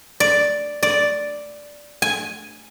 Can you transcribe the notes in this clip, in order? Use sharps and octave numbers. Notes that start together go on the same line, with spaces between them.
D5
D5
G#5